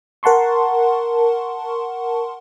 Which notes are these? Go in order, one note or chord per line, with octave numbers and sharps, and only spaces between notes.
A#4 F#5 A5 C6 C#6